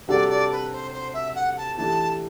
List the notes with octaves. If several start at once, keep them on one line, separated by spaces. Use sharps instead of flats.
C3 G3 D4 F#4 A4 D5
D5
B4
C5
C5
E5
F#5
A5
E3 A3 D4 G4 A5